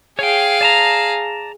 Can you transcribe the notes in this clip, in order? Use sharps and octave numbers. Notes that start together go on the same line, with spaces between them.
G#4 C#5 F5 G5
D5 A5 A#5